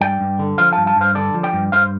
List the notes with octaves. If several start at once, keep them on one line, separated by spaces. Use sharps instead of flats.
G2 D5 G5
G2
D3
F3 C5 F5
G2 F5 A5
F5 A5
G2 C5 F5
D3 A4 D5
F3
D5 G5
G2
G2 C5 F5